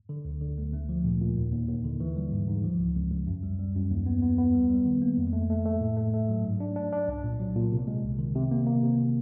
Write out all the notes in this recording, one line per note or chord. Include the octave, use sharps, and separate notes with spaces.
D3
D2
D3
D2
A3
F3
A#2
A#2
D#2
D#2
D#2
D3
E3
G3
G#2
G#2
F3
C#2
C#2
C#2
F#2
G3
G3
F#2
D#2
B3
B3
B3
G3
G3
D#3
A#3
F2
A3
A3
A3
A2
A3
A3
F#3
G#2
D4
D4
D4
C2
A#2
F#3
A#2
C3
G#3
C2
D#3
C3
A#3
A#3
C3